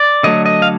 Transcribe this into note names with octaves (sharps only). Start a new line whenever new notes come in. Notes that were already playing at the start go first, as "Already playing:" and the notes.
Already playing: D5
D3 F#3 A3 D#5
D#5
F5